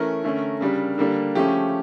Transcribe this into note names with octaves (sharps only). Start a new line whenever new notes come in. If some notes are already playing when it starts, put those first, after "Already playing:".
Already playing: E3 A3 C#4 A#4
D3 A3 C#4
C#3 G3 D4
D3 G3 A#3 D4
C#3 F3 A3 C#4 G4